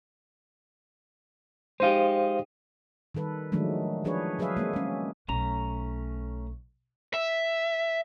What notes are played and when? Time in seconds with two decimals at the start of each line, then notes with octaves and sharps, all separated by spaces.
1.80 G#3 D#4 G4 C5 F5
3.15 D#3 G3 A4 B4
3.52 D#3 F3 F#3 G#3 A3 D4
4.05 F3 D4 G#4 B4 C#5
4.39 F#3 G#4 B4 C#5 E5 F5
4.57 G#3 A#3 C4
4.73 G#3 C#4
5.28 B1 A3 C#4 A#5
7.14 E5